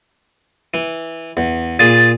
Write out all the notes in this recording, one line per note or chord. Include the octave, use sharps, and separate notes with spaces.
E3
E2
A#2 G#4 A6